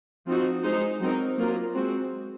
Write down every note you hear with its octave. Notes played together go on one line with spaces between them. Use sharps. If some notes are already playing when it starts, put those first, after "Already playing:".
F3 C4 D#4 F#4
G#3 D#4 G#4 C5
F#3 C4 D#4 A#4
F#3 A#3 F4 A#4
G#3 C4 F#4